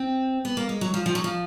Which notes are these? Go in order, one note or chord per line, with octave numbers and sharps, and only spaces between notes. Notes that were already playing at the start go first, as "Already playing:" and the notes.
Already playing: C4
B3
A#3
G#3
F#3
F3
F3
F#3
F3